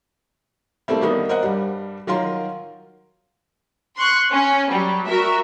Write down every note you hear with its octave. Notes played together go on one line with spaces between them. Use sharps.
G3 A3 A#3 C4 E4
D#3 G3 A#3 B3 D#4
A#4 C5 D#5 F#5
G2 G3
D#3 F#3 F4 A#4 C6
C6 C#6 F#6
C#4
F#3 G3
F#4 A#4 E5